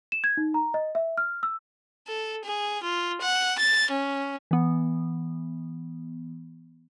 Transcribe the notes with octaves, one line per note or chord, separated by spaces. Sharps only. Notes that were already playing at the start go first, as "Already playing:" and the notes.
E7
G#6
D#4
A#5
D#5
E5
F6
E6
A4
G#4
F4
F#5
A6
C#4
E3 B3